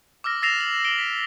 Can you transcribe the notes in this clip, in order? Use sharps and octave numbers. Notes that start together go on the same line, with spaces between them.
D6 E6 F6 A#6
E6 A6 A#6 C7 E7 F7
F#7
D7 F#7 G7
B6